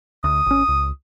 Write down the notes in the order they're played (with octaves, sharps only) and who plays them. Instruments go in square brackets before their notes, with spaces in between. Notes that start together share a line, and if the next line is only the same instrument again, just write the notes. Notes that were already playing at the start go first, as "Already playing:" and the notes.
[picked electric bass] D2 [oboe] D#6
[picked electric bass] G#1 C#4
C#2